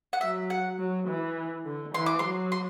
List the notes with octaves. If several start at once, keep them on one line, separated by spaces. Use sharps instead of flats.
F#5
F#3 E5
F#5
F#3
E3
D3
E3 C6
D6
F#3 C6
C6